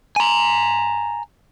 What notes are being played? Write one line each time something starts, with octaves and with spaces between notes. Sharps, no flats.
G#5 A#5